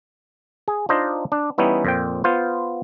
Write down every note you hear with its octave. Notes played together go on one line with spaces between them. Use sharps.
G#4
D4 D#4 F4 C5 D#5
D4
E3 G3 B3 C#4 D#4 E4
F2 A#2 C5 G5
B3 F4 C5